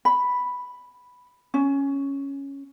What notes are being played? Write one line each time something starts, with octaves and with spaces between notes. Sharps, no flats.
B5
C#4